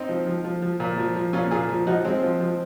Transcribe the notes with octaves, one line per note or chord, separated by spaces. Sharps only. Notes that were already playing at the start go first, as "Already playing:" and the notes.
Already playing: C4 D#4
F3
F3
F3
F3
A#2
F3
F3
A#2 C#4 F4
A#2 F4 G#4
F3
F3 D#4 F#4
F3 G#3 C4
F3
F3